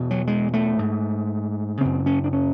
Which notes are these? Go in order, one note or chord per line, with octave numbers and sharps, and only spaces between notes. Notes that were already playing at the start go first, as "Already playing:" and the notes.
Already playing: E2 B2
F#3
G#3
A3
G#2
F#2 C#3 C4
C#4
D4
C#4